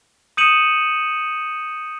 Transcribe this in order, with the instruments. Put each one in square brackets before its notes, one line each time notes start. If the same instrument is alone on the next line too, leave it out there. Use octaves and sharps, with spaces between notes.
[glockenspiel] D#6 G6 C#7 D#7 E7 F#7